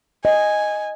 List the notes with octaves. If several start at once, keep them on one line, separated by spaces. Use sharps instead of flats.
D#5 G#5